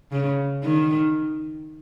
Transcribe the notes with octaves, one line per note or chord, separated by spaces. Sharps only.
C#3
D#3